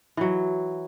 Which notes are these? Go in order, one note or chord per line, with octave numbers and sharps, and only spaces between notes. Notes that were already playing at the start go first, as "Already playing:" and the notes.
E3 F#3